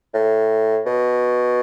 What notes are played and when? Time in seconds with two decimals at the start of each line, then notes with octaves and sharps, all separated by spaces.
0.14 A2
0.86 B2